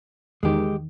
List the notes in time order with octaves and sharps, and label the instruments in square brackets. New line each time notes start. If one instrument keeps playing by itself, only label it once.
[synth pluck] E2 D#3 [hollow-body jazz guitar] G#3 G4